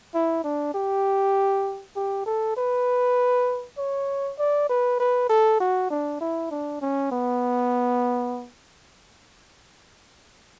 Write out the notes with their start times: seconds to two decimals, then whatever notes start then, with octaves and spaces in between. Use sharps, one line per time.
0.14 E4
0.44 D4
0.74 G4
1.96 G4
2.26 A4
2.57 B4
3.78 C#5
4.38 D5
4.69 B4
5.00 B4
5.29 A4
5.60 F#4
5.90 D4
6.21 E4
6.51 D4
6.81 C#4
7.12 B3